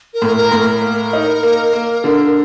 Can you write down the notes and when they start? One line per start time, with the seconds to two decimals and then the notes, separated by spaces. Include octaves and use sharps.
0.14 A#4
0.22 A2
0.37 A#4
0.52 A2
0.60 A#4
0.82 A#3
1.13 D#4
1.43 A#3
1.73 A#3
2.04 D3